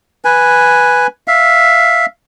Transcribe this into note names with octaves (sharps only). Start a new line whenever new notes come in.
B4 G#5
E5 F5